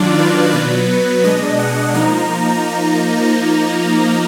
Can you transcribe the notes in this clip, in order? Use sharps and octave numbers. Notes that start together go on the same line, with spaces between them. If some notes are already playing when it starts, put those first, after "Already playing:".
Already playing: D#3 F#3 D4 F4 D5
B4
B2 F#3 B3 B4
B2 G#3 D4 D#5
F#5
F3 A#3 D#4 A#5